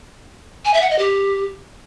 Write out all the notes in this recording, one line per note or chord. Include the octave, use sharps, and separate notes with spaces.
G#5
E5
F#5
D#5
G4